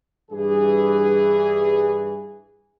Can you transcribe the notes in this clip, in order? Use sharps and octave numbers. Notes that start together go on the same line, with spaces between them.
G2 E3 G#4